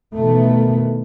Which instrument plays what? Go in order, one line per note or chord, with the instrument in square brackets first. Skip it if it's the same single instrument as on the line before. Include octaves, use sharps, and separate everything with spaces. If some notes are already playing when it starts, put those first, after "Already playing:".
[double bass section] B2 D#3 E3 A3 B3